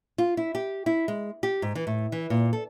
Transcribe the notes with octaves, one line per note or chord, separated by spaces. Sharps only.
F4
E4
G4
E4
G#3
G4
G#2
E3
A2
E3
A#2
A4